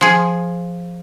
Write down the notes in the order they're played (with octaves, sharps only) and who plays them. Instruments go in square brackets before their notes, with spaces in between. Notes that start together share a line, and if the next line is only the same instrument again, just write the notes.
[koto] F3 G#4